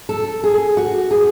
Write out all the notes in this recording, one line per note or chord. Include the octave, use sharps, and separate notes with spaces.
A4
G#4
F#4
G#4